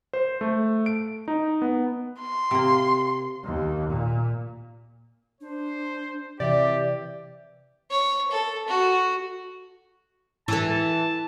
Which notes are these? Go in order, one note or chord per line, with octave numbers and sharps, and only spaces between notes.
C5
A3
D7
D#4
B3
C6
C3 A#3
D#2
A#2
D4 C5
C3 E3 G4 D5 E5
C#5
A4
F#4
E3 A4 A5